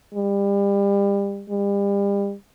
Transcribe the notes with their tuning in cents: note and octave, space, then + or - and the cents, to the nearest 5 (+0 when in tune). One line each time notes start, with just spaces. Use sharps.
G3 +30
G3 +35